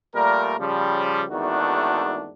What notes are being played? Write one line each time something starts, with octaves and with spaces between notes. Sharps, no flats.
A#2 G3 A3 A#3 A#4
C#3 F3 G3
G#1 E2 D#3 A3 D4 F#4